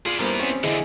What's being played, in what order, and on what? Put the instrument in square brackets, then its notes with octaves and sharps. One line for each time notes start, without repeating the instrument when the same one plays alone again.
[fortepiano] F4 [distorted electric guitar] G#4 D5
[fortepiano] G2 A#3 C5 [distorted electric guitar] E3 B3
[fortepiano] C4 C#4
[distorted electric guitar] E2 D3 [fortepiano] E4 G#4 D#5